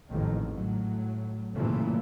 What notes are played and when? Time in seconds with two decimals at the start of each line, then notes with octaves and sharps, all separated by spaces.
0.10 A1 F2 G#2 D#3
0.50 A2 F#3
1.53 F#2 A#2 C#3 E3 A3